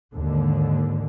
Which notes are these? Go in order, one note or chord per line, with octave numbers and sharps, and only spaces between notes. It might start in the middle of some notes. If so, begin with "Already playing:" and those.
D#2 G#2 D3